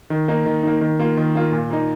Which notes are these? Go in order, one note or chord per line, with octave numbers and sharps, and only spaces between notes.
D#3
A#3 D#4
D#3
A#3 D#4
D#3
A#3 F4
D#3
A#3 F4
A#2
A#3 D#4